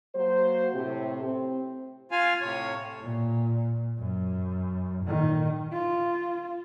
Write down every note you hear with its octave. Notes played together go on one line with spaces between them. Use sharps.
F#3 A#3 C5
A2 C3
C4
F4 F5 G#5
A2 C3 C#5
A#2
F#2
A#2 D#3
F4